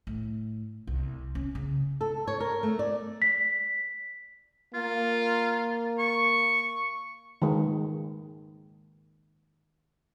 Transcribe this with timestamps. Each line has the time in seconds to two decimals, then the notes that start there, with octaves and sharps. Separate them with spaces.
0.07 A2
0.87 C2
1.35 C#4
1.55 C#3
2.01 A4
2.27 C#5
2.40 A#4
2.63 A3
2.79 D5
3.22 B6
4.74 A#3 F4
5.99 C#6
7.42 D#3 G#3